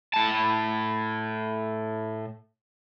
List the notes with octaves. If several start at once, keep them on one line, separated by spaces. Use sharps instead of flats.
A2 A5